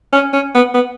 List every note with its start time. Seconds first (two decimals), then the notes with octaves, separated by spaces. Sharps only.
0.13 C#4
0.33 C#4
0.55 B3
0.74 B3